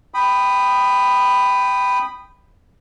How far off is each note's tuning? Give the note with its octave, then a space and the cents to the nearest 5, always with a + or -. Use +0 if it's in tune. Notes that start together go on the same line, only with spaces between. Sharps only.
G5 +0 B5 +10 D#6 -15